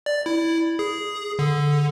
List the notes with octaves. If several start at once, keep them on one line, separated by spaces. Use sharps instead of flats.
D5
E4
G#4
D3